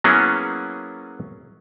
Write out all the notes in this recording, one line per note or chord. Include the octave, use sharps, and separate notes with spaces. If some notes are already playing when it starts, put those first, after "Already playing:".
F#3 A#3 B3 C#4 E4 G#4